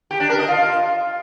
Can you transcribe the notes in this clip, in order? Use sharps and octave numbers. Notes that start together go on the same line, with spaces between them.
G4
D4
A#4
D#5
F4